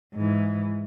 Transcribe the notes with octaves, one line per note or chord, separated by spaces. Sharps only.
G#2 E3